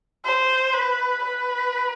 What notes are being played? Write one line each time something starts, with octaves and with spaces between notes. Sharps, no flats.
C5
B4
B4